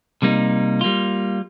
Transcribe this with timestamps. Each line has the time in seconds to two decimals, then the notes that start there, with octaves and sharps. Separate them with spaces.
0.22 C3 G3 A#3 D#4
0.81 G3 A#3 F4